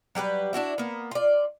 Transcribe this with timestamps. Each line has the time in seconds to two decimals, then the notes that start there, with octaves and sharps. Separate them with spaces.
0.15 F#3 G3 G4 B4
0.53 D4 E4 F#4 E5
0.78 A#3 B3
1.11 F4 D5